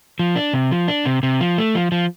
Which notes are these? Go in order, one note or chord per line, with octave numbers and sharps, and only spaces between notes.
F3
D4
C3
F3
D4
C3
C3
F3
A3
F3
F3